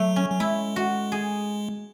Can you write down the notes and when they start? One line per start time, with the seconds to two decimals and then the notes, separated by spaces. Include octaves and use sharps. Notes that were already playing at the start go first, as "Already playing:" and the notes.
Already playing: F#3 A3
0.16 C#4
0.31 F#3
0.40 G#3 E4
0.76 F#4
1.12 G#4